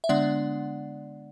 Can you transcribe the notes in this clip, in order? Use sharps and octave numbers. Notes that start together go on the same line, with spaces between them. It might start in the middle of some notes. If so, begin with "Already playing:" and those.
E5
D3 G#3 B3 D4 D5 F#5